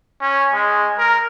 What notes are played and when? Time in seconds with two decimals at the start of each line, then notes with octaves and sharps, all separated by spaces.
0.21 C#4
0.53 G#3
0.98 A#4